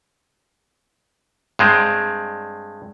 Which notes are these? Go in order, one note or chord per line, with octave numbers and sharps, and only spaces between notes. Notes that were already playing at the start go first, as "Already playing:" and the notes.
G2 G#3 C4